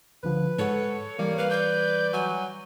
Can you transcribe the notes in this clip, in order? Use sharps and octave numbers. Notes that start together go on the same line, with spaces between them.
C#2 D3 F3 B4
G#2 A4 C#5 F#5
E3 G3 A#3 D5
B4 F5
D5 G6
F#3 G#5